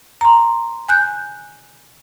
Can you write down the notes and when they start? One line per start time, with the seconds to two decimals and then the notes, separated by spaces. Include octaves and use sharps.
0.21 A#5 C6
0.89 G#5 F#6 G6